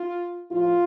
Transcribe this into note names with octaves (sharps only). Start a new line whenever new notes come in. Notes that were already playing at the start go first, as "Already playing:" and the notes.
Already playing: F4
A2 F3 F4